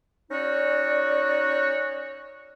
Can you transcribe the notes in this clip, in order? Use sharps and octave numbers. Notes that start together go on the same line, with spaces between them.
C#4 D#4 F#4 C#5 D5